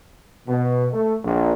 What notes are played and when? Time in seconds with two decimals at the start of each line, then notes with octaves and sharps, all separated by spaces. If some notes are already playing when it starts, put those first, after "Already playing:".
0.48 B2
0.93 A3
1.24 A#1